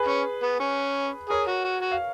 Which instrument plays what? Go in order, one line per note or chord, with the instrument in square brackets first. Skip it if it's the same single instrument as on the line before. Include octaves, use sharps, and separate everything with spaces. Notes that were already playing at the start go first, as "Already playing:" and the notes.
Already playing: [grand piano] G#4 B4
[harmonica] C#4
B3
C#4
[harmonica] G#4 [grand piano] A#4 C#5
[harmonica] F#4
F#4
F#4
[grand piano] F5